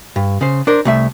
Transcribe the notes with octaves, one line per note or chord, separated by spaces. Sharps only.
G2
C#3 C5
D4 A#4 C5
C2 A3 E5